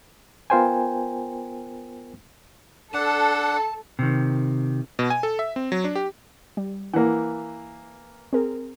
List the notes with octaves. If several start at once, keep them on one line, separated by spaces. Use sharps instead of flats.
B3 F4 A#4 C5 G5 G#5
D4 A4 F#5 A5
C3 D#3
B2
G#5
A4
E5
C4
F#3
D4
G4
G3
E3 A#3 F#5
C4 G#4 A#4